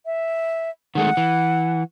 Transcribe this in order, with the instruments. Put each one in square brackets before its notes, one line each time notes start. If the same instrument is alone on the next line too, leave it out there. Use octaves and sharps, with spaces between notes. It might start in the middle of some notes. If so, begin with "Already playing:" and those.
[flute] E5
[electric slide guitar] D#3 G#3 A3 [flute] F#5
[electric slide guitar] E3